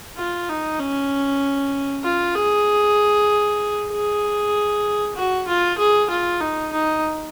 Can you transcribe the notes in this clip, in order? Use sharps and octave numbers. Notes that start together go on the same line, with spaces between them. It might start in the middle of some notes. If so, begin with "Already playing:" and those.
F4
D#4
C#4
F4
G#4
G#4
F#4
F4
G#4
F4
D#4
D#4